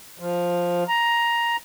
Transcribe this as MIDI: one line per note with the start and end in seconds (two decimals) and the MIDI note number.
0.19 0.84 53
0.88 1.56 82